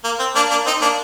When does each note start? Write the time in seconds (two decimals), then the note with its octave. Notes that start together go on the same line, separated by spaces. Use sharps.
0.04 A#3
0.19 C4
0.35 A#3 D4
0.51 A#3 D4
0.66 C4 D#4
0.81 A#3 D4